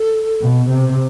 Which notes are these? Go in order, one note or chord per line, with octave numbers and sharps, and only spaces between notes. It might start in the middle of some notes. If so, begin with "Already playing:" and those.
Already playing: A4
B2
C3